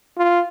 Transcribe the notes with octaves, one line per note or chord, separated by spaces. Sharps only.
F4